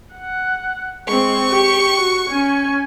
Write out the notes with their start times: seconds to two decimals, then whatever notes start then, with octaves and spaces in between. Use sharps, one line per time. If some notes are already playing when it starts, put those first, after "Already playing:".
0.13 F#5
1.08 G#3 C4 C#6
1.49 G4
1.97 F#4
2.29 C#4 G#5